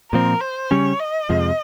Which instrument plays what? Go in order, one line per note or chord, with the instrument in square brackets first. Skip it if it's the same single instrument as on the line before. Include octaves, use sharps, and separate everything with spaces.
[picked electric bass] A#2 F3 C4 [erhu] A#4
[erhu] C5
[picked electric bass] C#3 G3 C#4 [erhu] C#5
[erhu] D#5
[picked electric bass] F2 C3 F3 G#3